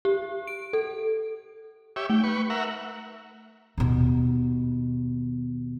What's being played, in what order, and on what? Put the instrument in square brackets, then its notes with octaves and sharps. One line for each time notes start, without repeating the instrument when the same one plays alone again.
[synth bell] G4
D7
A4
[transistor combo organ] G4 C#5 E5
[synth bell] A3 [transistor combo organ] G5
[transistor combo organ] B4 C#6
A#4 E5 F#5
[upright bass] D#2 B2